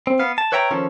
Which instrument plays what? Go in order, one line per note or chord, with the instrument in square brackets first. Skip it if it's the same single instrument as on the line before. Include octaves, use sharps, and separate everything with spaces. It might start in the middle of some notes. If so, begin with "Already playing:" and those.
[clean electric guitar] C4
B3 F5
A5
B4 C#5 E5 G5 A5 A#5
D#3 F3 C#4 A4